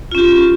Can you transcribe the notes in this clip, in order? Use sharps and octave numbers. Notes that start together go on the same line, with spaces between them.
C#4 F4 G4